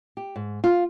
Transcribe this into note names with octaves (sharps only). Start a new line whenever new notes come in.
G4
G#2
F4